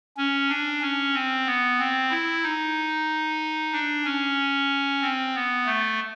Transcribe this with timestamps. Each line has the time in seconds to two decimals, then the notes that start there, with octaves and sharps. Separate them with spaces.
0.17 C#4
0.49 D4
0.81 C#4
1.13 C4
1.47 B3
1.79 C4
2.11 E4
2.43 D#4
3.73 D4
4.05 C#4
5.01 C4
5.35 B3
5.66 A3